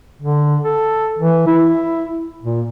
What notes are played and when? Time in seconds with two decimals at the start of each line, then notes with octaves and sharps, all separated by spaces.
0.22 D3
0.63 A4
1.19 E3
1.47 E4
2.42 A#2